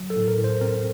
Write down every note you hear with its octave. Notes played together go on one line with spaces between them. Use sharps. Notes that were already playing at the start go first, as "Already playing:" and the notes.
Already playing: F#3
A4
A2
A#4
A2
C5
C4 A#4